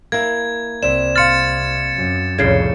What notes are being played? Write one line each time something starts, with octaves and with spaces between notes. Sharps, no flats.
A#3 E4 G#6
C2 C4 D5 E5 E7
F5 C6 F6 A6 C#7
F#2
C2 F2 A2 C#3 G5 G#6 C7